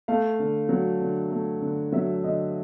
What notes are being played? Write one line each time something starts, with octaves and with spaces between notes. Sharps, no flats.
A3 F5
D3
F#3
D3
A3
D3
F#3 E5
D3 D#5